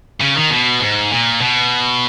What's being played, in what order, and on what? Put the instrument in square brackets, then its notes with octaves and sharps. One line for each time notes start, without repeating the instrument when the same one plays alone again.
[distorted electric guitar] C#3
D#3
B2
G#2
A#2
B2